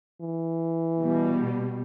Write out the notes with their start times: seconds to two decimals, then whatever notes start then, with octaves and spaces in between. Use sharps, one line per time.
0.21 E3
1.03 B2 G3